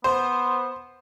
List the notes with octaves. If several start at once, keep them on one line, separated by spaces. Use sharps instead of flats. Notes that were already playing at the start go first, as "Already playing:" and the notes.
B3 C5